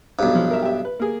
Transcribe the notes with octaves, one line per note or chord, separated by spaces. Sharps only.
B1 G2
F3
A#4 E5
G4 E5
B4
A#3 G#4